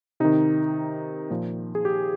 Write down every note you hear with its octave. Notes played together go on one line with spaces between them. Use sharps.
C3 D#3 D#4
A#2 F3
G#4
G4